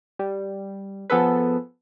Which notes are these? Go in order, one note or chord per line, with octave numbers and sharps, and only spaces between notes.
G3
F3 B3 G#4 A4 B4